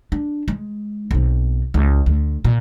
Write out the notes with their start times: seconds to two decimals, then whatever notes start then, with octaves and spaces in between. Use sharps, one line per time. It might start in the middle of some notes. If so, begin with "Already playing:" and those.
0.12 D4
0.48 G#3
1.11 B1 C4
1.74 C#2
2.06 D2
2.44 A#2